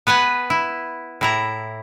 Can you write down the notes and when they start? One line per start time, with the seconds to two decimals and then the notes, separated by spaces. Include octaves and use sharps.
0.07 B3 B4 F#5 G#5
0.50 E4
1.21 A2 E4 A#5